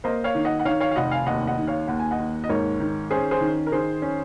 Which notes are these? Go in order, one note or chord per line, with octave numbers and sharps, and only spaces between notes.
A#3 C5 D#5
C#5 F5
D#3
D#5 F#5
F#5
D#3 C#5 F5
C#5 F5
F5
F1 D#5 F#5
F5 G#5
D#2 D#5 F#5
D#5 F#5
D#3
C#5 F5
D#2 F#5
G#5
D#5 F#5
D#2
D#5
G#2 A#4 C#5
D#3
C#4 G#4 C5
G#4 C5
D#3
A#4
D#3 G#4 C5
C#4